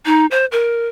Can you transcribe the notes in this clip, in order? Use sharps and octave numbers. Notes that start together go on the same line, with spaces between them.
D#4
C5
A#4